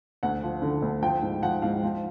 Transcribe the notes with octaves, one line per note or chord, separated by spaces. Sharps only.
D2 F#5
F3
D3
D2
F3 G5
G#2
F3 F#5
G#2 F5
F3